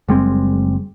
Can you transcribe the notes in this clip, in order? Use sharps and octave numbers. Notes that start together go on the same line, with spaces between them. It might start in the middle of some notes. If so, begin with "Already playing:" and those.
F#1 G3 G#3 C4